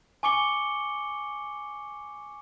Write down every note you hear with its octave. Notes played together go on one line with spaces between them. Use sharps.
G#5 C#6 D6 C#7 G7